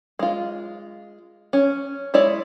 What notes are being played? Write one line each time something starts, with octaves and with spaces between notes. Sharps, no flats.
G#3 F4
C#4
G#3 E4 C#5 D5